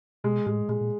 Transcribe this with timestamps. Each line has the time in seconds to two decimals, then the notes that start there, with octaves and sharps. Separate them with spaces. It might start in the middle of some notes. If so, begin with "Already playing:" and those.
0.24 B2 G#3
0.46 A2 G#3
0.69 A#2 G#3
0.80 A#2